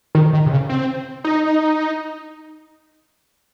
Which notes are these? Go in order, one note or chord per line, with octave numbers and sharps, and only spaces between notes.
D#3
D#3
C3
C#3
C4
D#4